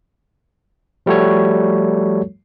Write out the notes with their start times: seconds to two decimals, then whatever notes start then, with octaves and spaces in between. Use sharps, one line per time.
1.06 F3 G3 A3 F#4 A4 C#5